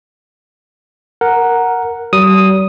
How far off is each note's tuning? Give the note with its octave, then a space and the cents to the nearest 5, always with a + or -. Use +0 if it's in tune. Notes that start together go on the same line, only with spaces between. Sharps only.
A#4 +0 F#5 +0
G3 -45 D#6 +0